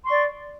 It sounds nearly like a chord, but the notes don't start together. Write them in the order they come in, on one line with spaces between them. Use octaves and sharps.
C6 C#6 D5